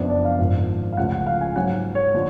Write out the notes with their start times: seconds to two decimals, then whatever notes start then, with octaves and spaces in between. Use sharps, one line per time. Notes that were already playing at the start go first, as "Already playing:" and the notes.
Already playing: F#1 F2 F3 B3 D4
0.10 D5
0.25 F5
0.39 G#1 G#2 F3
0.93 F5
0.97 C#2 C#3 F3 A3 F#5
1.12 F#5
1.26 F5
1.41 G#5
1.56 G#2 F#3 C#4 F#5
1.95 C#5
2.14 D3 F3